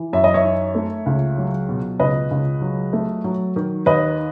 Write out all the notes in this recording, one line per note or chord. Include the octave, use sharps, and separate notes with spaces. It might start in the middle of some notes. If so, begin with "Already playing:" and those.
Already playing: E3
F#2 E5
D#5
C#5 E5
D#4
A3
C#2
F#3
B2
C#2 B4 D#5
C#2
F#3
A3
F#3
D#3
D#2 B4 D#5